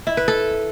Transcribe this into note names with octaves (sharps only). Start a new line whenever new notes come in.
E4
B4
A4